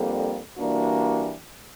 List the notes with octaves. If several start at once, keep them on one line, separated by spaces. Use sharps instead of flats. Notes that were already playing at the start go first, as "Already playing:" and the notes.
Already playing: F2 D3 G3 A#3
E3 G3 A#3 D4 F#4